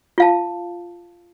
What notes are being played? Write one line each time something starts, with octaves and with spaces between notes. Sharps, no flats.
F4 F5 A5